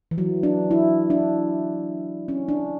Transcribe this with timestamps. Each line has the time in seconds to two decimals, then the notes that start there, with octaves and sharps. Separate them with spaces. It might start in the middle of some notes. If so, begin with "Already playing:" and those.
0.11 E3
0.18 F#3
0.43 D4
0.71 E4
1.10 D4
2.28 C#4
2.49 D4